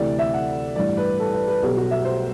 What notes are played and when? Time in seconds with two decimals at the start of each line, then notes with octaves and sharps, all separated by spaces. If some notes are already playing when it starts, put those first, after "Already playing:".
Already playing: D2 C3 E3 D5
0.19 E5
0.34 F#5
0.76 A1 G2 E3 D5
0.97 B4
1.20 A4
1.34 B4
1.48 B4
1.62 B1 B2 G4
1.77 F#4
1.91 E5
2.05 C5